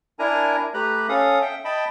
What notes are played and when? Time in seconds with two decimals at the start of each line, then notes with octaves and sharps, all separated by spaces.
0.19 D4 E4 A#4 G#5 A#5
0.74 A3 G4 B4 A#5 F#6
1.09 C#4 A4 F5 D#6
1.42 E5 G5
1.65 D#5 G5 A5 B5